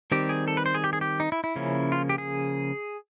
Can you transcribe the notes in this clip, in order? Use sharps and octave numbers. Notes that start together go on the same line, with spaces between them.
D#3 G3 C4 G4
G#4
A4
B4
C5
G#4
G4
G#4
G4
D#4
E4
E4
C#3 F3 A#3 C#4
F4
G4
G#4